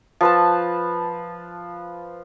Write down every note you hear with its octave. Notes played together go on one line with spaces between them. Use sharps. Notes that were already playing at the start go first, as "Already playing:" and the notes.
F3 B4 A5